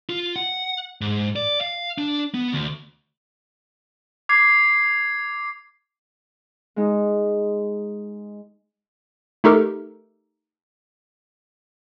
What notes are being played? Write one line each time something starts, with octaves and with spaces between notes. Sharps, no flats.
F4
F#5
G#2
D5
F5
D4
B3
D2
D6 G#6 C7
G#3 D#4
A3 D#4 G4 A4 A#4